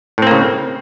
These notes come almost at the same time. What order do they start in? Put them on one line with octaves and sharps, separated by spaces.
A2 C4 A#3 C#3